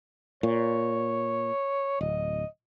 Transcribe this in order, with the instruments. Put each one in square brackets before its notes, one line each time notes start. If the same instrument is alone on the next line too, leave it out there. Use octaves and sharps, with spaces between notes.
[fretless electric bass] A#2 [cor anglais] C#5
[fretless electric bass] D1 [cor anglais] D#5